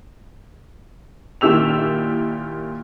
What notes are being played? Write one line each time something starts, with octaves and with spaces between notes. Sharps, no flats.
A#2 D#3 E4 G4 E6 F7